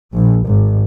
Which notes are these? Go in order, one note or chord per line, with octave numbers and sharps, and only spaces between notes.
A#1
G#1